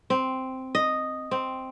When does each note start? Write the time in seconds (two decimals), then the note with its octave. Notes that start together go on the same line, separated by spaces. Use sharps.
0.10 C4
0.75 D#5
1.31 C4